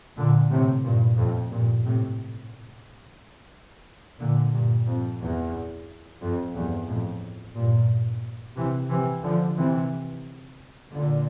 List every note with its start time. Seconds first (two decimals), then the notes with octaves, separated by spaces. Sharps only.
0.17 A#2 D3
0.51 A2 C3
0.84 G2 A#2
1.18 F2 A2
1.51 G2 A#2
1.85 A2 C3
4.19 A#2 D3
4.53 G2 A#2
4.87 F2
5.21 E2
6.22 F2
6.55 E2 G2
6.88 F2 A2
7.55 G2 A#2
8.56 C3 E3
8.90 C3 E3
9.24 D3 F3
9.57 C3 E3
10.92 A#2 D3